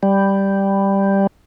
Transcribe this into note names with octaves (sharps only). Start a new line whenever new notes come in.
G3